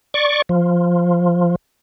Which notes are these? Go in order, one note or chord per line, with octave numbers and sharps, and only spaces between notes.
D5 C#6
F3